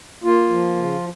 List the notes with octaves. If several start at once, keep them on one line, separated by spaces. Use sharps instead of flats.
A#3 F4
F3
C#3